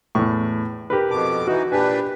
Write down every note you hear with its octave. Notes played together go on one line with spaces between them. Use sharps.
E2 A2 C#6
G4 A#4 B4
F2 B2 A5 D6
E3 D#4 F#4
A#2 D4 G4 B4 G#5